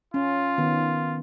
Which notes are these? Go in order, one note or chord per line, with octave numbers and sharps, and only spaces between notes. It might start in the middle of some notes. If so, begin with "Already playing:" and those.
C#4 F4
D#3 B3